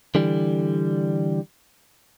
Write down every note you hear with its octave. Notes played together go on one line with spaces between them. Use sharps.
D3 E3 G3